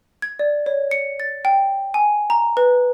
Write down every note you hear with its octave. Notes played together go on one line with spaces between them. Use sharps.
G#6
D5
C#5
C#7
A6
G5
G#5
A#5
B4